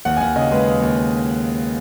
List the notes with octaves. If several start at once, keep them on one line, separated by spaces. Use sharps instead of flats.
D#2 F#5
G#5
D#2 F#5
C#3 D#5
G#3 B4
D#2
D#2